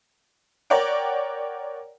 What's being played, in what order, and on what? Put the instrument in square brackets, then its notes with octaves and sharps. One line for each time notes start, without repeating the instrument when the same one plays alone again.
[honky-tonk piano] A#4 C#5 D5 F#5 G5